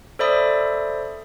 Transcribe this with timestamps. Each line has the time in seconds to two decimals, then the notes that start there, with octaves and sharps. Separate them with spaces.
0.19 A4 C5 D5 E5 B5 D#6